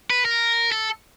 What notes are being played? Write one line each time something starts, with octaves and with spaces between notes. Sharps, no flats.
B4
A#4
A4